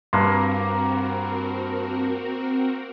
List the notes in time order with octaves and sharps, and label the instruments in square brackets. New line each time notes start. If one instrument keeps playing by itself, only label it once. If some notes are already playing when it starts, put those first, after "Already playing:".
[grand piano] G2 C6 [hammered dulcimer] A#3 [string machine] C4 F#4 A#4